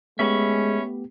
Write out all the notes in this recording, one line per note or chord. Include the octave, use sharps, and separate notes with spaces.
G#3 A3 B3 C#4 G4 E5 B5 C#6